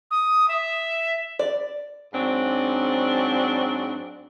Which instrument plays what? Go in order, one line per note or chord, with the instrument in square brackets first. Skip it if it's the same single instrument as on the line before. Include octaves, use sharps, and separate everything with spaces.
[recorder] D#6
E5
[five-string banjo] D5
[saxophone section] G#2 F#3 C4 D4